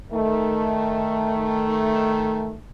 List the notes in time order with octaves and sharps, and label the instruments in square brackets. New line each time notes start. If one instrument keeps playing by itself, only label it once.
[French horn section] D#3 A3